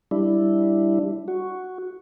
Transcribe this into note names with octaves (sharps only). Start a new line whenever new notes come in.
G3 D4 E4
F#4